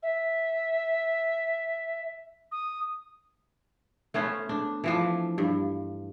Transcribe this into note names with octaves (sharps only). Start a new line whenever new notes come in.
E5
D#6
A3 B3 C#4 C5
D4
E3 F3 D4
G2